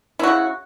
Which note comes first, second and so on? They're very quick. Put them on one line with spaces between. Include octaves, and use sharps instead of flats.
E4 F#4 C#3